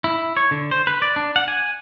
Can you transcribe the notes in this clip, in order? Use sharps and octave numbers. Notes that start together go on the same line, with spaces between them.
E4
C#5
D3
C5
B4
D5
D4
F#5
G#5